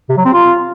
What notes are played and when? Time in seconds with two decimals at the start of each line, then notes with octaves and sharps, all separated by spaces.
0.09 C3
0.17 F#3
0.25 C4
0.33 F4